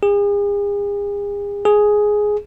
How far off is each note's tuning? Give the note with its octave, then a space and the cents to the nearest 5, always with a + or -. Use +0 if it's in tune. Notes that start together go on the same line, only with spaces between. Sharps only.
G#4 -40
G#4 +5